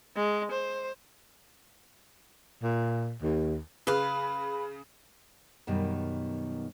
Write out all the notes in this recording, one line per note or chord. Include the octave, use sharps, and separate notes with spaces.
G#3
C5
A#2
D#2
C#3 B4 F5
F#2 B2 D#3 G3